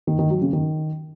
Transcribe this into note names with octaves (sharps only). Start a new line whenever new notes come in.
D#3
D#3
F#3
C#3
D#3